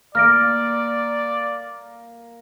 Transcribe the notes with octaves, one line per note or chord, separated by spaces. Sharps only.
A#3 D5 F6 A#6 D7